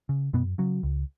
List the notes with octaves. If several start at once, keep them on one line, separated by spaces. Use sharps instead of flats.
C#3
F#2 B2 B3
C#3 F#3
C#2